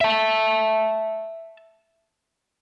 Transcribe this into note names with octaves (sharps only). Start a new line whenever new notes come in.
E5 A5